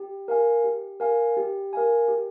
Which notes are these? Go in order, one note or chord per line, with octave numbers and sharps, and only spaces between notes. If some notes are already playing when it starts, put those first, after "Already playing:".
Already playing: G4
A#4 F5 G#5
G4
A#4 F5 G#5
G4
A#4 F5 G#5
G4